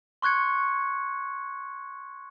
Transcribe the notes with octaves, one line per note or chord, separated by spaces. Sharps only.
C6 C#6 F#6 G#6 C#7